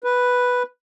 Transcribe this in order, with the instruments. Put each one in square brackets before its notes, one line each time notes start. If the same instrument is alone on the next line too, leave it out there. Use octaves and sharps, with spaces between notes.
[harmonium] B4